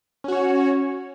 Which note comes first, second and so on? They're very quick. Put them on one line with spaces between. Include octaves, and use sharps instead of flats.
C#4 F#4 C#5